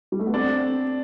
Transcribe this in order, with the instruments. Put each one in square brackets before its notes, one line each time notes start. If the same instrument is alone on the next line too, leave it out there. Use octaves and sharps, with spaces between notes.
[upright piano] G3
A3
B3
[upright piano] C4 [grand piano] D4